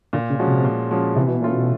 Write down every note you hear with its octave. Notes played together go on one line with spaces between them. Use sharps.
A#2 D3
C#3
F3 G#3 C#4 F#4
C3
A#2
F3 G#3 C#4 F#4
C3 E3
B2
A#2 A3 C#4 F4 A4
B2